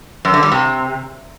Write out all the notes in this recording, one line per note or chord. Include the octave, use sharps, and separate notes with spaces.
F#2
D3
G3
C3